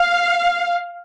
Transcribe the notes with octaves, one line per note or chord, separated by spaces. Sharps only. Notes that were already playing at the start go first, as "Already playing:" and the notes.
Already playing: F5